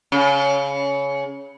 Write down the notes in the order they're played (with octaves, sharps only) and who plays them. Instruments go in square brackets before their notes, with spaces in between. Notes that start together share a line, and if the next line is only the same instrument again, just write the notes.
[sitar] C#3